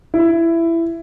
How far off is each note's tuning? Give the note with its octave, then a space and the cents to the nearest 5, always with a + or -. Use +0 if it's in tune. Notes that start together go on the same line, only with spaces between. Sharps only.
E4 +15